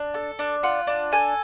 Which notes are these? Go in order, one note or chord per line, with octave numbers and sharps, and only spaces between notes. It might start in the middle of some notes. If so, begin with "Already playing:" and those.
Already playing: D4
A4
D4
F4 F#5
D4
A4 G#5